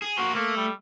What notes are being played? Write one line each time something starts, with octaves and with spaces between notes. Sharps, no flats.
G#4
A#3 F#4 C5
A3 A#3
G3